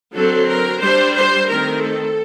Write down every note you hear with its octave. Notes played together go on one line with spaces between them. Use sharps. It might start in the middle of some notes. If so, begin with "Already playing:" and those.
D3 F#3 C4 A4
A#4
G3 D4 C5
C5
D#3 A3 C4 A#4
A4